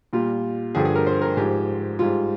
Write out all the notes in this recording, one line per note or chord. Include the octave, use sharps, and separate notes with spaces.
A#2 G3 F4
G2 D3 F3 G#4
G#4
A#4
C5
A#4
G#2 F3 G4
G#2 G3 F4